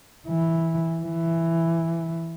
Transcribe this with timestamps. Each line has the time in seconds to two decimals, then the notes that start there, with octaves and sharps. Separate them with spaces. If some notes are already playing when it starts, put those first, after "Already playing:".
0.28 E3
1.03 E3